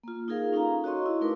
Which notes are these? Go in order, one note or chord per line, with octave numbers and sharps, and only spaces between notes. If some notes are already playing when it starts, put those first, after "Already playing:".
A#3 F4
D#4 F4 G#4 A#4 F5
C#4 D#4 A4 F5 A#5
F#4 C#5 D#5 C6 C#6
E4
A3 D#4 A#4 B4 D6